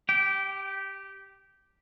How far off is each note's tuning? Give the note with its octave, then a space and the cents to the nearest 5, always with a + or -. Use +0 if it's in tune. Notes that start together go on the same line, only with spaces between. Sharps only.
G4 +0 G5 -20